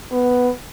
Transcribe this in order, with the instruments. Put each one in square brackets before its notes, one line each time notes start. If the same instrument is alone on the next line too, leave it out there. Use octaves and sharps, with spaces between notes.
[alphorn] B3